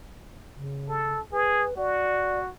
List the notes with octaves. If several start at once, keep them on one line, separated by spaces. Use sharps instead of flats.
C#3
A4
G#4 B4
F#4 D5